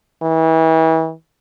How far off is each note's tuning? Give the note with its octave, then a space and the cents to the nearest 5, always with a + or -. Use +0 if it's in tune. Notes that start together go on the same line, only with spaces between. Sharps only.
E3 -35